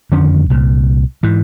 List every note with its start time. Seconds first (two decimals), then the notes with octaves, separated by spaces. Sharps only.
0.12 F2 D3 D#3 C#4
0.50 C2 A#2
1.23 G#2 E3